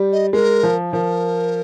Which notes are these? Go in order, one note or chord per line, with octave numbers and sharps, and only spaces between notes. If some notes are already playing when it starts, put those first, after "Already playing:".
Already playing: G3
D#5
G#3 A#4
F3
F3 A#4